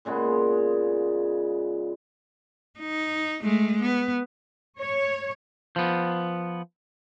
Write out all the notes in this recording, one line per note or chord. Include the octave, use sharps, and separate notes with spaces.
A#2 C#3 G#3 B3
D#4
G#3 A3
B3
C#5
F3 B3